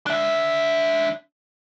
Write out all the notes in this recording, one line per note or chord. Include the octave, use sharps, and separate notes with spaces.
D4 E5